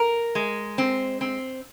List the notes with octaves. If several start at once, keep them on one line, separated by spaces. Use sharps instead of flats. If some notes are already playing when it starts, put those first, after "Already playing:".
Already playing: A#4
G#3
C4
C4